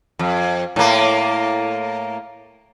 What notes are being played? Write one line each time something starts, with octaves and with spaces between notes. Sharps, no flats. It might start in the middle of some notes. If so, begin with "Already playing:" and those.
F2
A2 A#3